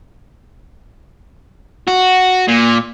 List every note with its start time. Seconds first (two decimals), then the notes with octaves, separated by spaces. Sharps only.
1.87 F#4
2.48 A#2